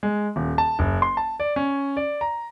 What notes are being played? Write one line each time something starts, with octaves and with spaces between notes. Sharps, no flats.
G#3
D#1
A5
F#1
C6
A5
D5
C#4
D5
A#5